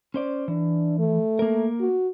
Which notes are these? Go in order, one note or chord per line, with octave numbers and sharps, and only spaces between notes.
C#4 C5 D5
E3 D4
A3
A#3 A#4
F#4